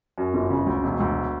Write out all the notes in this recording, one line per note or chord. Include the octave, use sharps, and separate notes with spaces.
F#2
G1
C#3
D2
E1
D2